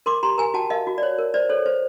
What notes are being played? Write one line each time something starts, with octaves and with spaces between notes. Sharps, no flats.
A#4 C6 D6
G4 A#5 C6
A#4 G#5 A#5
F#4 G5 A5
A#4 D#5 F5
F#4
D5
C#5
A#4
C5 D5
A4 C#5
C5